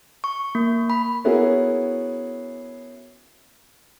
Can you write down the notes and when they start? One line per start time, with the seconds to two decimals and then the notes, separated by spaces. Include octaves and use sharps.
0.24 C#6
0.55 A#3
0.90 B5
1.25 B3 C#4 E4 F#4 G#4 A#4